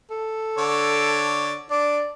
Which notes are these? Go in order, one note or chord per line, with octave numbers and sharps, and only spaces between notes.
A4
D3 C#5 D5
D4 D5